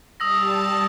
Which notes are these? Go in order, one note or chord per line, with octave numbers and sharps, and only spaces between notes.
G3 A5 D#6 E6 A#6